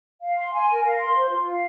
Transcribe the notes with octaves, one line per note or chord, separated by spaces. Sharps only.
F5
C6
G#5
A#4
F5
C6
C5
F4
F5